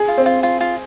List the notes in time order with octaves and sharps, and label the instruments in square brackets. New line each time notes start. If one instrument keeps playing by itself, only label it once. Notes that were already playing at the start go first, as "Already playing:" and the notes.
Already playing: [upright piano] G#4
[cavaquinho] F4
[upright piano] C4
[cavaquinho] F4
F4
F4